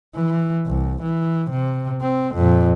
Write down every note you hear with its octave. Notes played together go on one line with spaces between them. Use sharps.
E3
C2
E3
C3
C4
F2 A#2